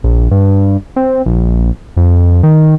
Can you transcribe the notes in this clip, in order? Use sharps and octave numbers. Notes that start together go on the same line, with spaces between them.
A#1
G2
C4
A#1
F2
D#3